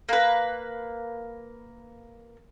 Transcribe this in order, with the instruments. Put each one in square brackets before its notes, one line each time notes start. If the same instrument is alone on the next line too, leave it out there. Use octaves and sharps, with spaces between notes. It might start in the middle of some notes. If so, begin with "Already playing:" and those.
[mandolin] A#3 B4